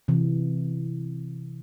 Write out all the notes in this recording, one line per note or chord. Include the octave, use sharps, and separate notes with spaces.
C3 E3